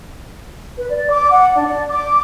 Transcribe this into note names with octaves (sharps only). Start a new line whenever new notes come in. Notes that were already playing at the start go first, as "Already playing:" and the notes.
B4
D5
D6
F#5
D4
D5
D6